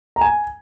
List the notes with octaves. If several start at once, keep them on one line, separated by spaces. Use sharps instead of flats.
A#5
G#5